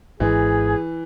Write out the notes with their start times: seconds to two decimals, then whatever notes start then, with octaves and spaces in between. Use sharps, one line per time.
0.20 G#1 G#2 E3 G#4